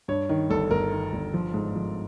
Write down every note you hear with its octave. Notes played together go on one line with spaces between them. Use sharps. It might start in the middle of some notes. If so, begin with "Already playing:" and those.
G2 C#5
D#3
G1 A4
G1 A#4
D#3
G1
F3
G#2
F3